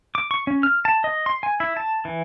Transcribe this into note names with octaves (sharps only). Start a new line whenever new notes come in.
D6
C#6
C#4
F6
A5
D#5
C6
G#5
E4
A5
E3